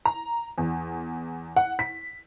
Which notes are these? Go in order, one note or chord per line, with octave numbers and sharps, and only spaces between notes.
A#5
E2
F#5
B6